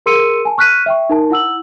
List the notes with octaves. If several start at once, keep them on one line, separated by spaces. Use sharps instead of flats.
G#4 A#4 C6 E6 C#7 D#7
G#5 A5
C#6 F6 F#6 B6 D#7
E5 G5 C#6
D#4 A#4 A5
E4 F#5 E6 F#7